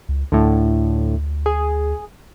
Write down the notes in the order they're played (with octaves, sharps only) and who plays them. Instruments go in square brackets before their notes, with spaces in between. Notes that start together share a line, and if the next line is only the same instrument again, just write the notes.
[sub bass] C#2
[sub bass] D2 [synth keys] A2 D3
[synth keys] G#4